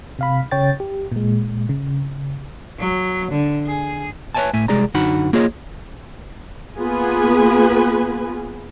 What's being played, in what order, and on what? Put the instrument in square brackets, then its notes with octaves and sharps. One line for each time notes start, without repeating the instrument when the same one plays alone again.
[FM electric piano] C3 F5 B5
C#3 C#5 G5 A6
G4
A#2 G#3
C#3
[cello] F#3
D3
G#4
[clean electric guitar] B4 C#5 D5 E5 G#5 A5
A2 E5 G#5
C2 C3 G#3 G#4 D5 A#5
F#2 D3 D#4 F#4 F#5 B5
A#3 F4 G#4 C#5 D#5
[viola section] A#3 B3 F4 G#4 B4 G#5